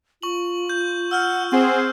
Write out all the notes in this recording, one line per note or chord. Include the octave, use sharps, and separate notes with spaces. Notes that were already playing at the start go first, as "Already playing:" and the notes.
F4 C#6 F#7
G6
F#5 E6 F6 G6
C4 G#4 C5 F#5